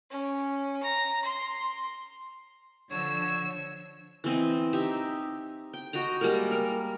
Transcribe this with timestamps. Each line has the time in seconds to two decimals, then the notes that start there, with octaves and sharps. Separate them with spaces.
0.11 C#4
0.83 A#5
1.24 C6
2.91 D3 F3 C#5 E6
4.24 E3 C4 D#5
4.73 D#4 G4 E5
5.74 G5
5.93 F#4 D#5 G5 A#5
6.21 G3 G#3 A#3 A#4
6.51 A#4